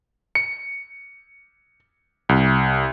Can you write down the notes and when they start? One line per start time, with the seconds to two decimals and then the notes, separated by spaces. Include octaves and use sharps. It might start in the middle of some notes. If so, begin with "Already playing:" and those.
0.35 C#7
2.29 C2